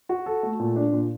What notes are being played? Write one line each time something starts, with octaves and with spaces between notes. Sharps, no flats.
F#4
A4
A3
A#2
D4
A#2